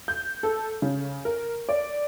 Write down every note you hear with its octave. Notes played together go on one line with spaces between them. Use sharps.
G6
A4
C#3
A#4
D5